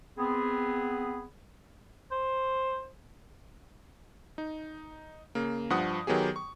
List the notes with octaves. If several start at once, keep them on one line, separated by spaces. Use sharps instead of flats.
B3 C4 G#4
C5
D#4
C#3 A#3
G2 F3 F#5 D#6
D#3 F#3 B3 G4 G#4
C#6